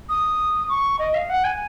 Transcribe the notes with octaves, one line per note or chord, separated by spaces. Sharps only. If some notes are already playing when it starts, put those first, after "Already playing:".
D#6
C#6
D#5
F5
F#5
G#5